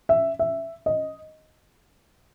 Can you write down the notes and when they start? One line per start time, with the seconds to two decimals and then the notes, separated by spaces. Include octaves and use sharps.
0.09 E5
0.39 E5
0.86 D#5